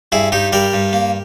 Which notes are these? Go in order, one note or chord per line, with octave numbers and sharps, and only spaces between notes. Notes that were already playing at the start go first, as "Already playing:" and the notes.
G2 E4 G#4
G2 D#4 G4
G3 G4 A#4
G2
A#3